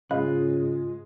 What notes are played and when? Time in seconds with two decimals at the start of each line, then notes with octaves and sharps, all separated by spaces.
0.11 G#2 C#3 G#3 F4 D#5 F5 B5 F#6